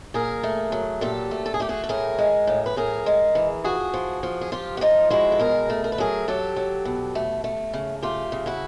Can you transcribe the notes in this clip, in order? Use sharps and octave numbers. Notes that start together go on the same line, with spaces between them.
A#2 G#4 A#4
A3
F#3
A#2 G4 A4
A3
A4
G#4
A3 G4
F#4 G#4
A4
A2 G#4 A#4
G#3
A2
B4
A2 G#4 A#4
G#3
E3
F3 F#4 G#4
F3
F3
G#4
F3 F4 G4
F#4
F3 D#4 F4
G#3 E4 F#4
A4
B2 G#4 A#4
A3
A#4
B4
F#3 G#4 A#4
F#3 G4 A4
F#3
B2
A3
A3
C#3
A3 F4 G4
C#3
E4 F#4